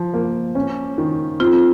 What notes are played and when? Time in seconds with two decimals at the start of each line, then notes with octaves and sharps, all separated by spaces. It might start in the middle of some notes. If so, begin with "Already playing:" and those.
Already playing: F3
0.14 A#3
0.55 C#4
0.98 D#3
1.40 C4 F4